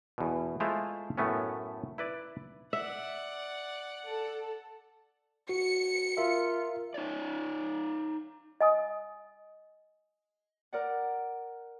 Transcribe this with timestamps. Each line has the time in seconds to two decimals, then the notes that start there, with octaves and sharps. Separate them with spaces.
0.18 E2 B2
0.60 G#3 A3 E4 F4 C5 F5
1.18 F#2 A2 A3 B3 C#4
1.98 E4 B4 D5
2.73 D5 E5 F#5
4.06 A4
5.49 F#4 C#7
6.17 F4 A#4 E5 F5
6.94 D#4 C#5 D5
8.61 D#5 G#5 D#6
10.73 A#4 D5 F#5